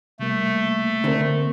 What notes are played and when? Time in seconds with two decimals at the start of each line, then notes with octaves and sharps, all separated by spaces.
0.19 C3 G3 A3 A#3
1.04 D3 A#3 C4 A#4